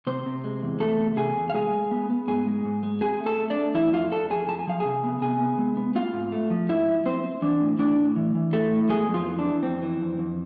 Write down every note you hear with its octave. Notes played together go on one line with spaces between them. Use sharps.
C3 C4 C5
C3
G#3
E2
E2 A3 A4
C3
C3 G#4 G#5
E2
F5
G#3 G#4 G#5
G#3
B3
B3
G#2 G#4 G#5
G#3
G#2
G#3
C4 G#4 G#5
A3
A4 A5
A3
D4 D5
A3
E3 E4 E5
F2 F4 F5
F2 A4 A5
F2 G#4 G#5
F3 A5
G#5
F3 F5
C3 G#4 G#5
B3
C3 G#4 G#5
B3
G#3
B3
C4 F4 F5
G#2
A3
F3
G#2 E4 E5
F3
F3 C4 C5
C4
E3 D4 D5
A2
A2 D4 D5
A2
E3
E3
A2 A3 A4
A2
G#3 B3 G#4
F2
F3 F4
E3
D4
E3
F2 C4
E3
F2
F2